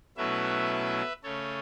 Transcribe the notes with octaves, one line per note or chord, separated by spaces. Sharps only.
B2 F#3 A3 C#4 E4 B4 E5
C#3 A3 C#4 A4 C#5